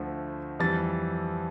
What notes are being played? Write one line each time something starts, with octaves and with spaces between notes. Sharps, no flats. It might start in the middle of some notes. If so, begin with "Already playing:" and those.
Already playing: D2 D3 F3 A3
F2 E3 G3 A6